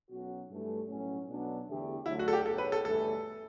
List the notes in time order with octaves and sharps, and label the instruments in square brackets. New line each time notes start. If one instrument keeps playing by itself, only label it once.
[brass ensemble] B1 B2 F#3 C#4 F#4
G2 E3 A3
B1 A2 F#3 C#4
B1 B2 F#3 B3 D4
E2 D3 A3 E4 G4
[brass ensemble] D2 D3 F#3 [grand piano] E4
[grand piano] F#4
A4
G4
[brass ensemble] B1 B2 F#3 [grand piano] A4
[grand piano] B4
A4
[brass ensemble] G1 G2 E3 A3 [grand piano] A4